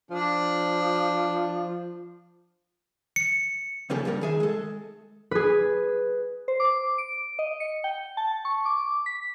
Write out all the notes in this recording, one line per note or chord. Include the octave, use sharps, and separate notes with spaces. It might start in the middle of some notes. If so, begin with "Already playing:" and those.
F3 D4
C#7
C#3 F3 A#3 C#4 G4 A4
C2 G2 G3 A#4
D#3 G#4 E5
G#3 A4
G#4 B4
C5
D6
D7
D#5
C#7
G5
A5
C#6
D6
B6